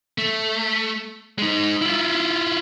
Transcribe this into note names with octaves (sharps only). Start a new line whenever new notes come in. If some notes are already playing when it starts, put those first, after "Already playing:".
A3
G#3 D#4
E4 F4